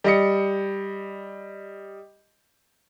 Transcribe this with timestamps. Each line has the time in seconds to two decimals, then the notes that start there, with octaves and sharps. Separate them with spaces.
0.04 G3 D#5 C#7